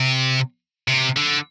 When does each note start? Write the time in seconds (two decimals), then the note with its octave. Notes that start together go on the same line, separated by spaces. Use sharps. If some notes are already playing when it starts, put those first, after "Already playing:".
Already playing: C3
0.88 C3
1.16 D3